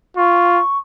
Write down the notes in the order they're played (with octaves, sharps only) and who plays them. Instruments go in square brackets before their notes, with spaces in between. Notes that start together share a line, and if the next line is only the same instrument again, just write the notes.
[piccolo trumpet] F4 [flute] C#6